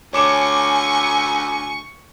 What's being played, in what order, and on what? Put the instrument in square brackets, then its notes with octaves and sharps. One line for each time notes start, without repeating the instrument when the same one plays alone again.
[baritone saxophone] D2 [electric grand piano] C#5 D6 E7 [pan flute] G#5 [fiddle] C#6